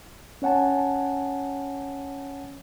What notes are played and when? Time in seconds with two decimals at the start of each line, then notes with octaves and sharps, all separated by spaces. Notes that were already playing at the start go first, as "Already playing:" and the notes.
0.42 C#4 C#5 F#5 G#5 A5